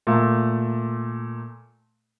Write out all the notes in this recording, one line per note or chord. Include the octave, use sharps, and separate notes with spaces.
A#2 A3